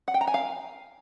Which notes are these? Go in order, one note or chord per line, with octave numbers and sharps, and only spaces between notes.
F#5
G5
A#5
G#5
F5